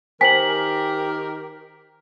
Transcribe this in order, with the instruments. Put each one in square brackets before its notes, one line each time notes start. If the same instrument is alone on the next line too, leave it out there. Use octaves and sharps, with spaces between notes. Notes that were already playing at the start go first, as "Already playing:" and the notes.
[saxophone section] D#3 G4 A#4 [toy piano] C5 G5 G#5 [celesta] B6 F#7